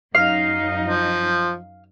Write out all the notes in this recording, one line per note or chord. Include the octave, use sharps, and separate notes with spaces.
F#2 D#4 F5
F3